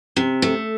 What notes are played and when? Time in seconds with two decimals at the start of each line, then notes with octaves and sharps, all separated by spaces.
0.16 C3
0.42 A3